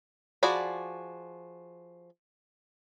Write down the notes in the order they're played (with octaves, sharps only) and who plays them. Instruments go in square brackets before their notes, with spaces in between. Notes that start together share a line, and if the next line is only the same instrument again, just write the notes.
[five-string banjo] F3 F#4 G#4 D5 B5